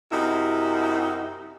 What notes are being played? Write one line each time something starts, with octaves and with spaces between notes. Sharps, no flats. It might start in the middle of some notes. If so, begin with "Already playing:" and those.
F#2 C3 D#4 E4